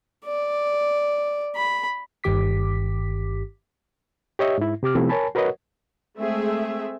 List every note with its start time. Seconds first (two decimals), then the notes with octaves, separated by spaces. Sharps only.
0.26 D5
1.56 B5
2.24 G1 G2 D#3 G4 D6 B6
4.39 G4 C#5 D#5 E5
4.58 G#2 E4
4.83 C3 G4 D6 F6
4.95 C3 F3 A3 B3 C4 E4
5.09 A#4 C#5 G#5 A5 B5
5.35 F#4 A#4 B4 C#5 D#5 F#5
6.18 G#3 A3 C4 G#4 E5